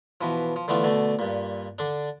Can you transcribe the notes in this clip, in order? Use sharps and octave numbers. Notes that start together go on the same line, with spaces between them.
B2 E3 F3
F3
D3 E3 A3 B3 F4
B2 D3 A3
G2 A#2
D3 D4